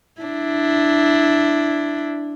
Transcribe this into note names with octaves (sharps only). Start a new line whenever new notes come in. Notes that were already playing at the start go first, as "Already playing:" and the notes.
D4 E4